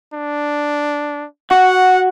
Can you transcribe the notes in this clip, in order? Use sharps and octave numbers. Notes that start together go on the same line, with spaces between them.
D4
F#4 F#5